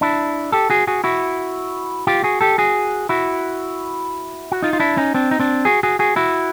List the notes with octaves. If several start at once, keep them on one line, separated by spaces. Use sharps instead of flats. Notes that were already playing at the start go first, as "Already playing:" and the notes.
D4 E4
G4 A4
F#4 G#4
F#4 G#4
E4 F#4
F4 G4
F#4 G#4
G4 A4
F#4 G#4
E4 F#4
F#4
D#4 F4
F4
D4 E4
C#4 D#4
C4 D4
D#4
C4 D4
F#4 G#4
F#4 G#4
F#4 G#4
E4 F#4